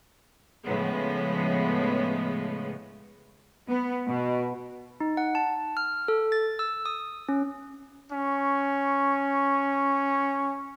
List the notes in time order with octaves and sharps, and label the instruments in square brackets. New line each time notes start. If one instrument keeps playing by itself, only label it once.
[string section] A2 C#3 F3 G#3 B3
[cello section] B3
B2
[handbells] D#4
F#5
A5
F6
A4
A6
E6
D#6
C#4
[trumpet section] C#4 C#6